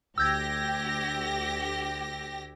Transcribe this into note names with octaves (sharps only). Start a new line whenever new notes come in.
D2 G4 E6 G6 G#6 A#6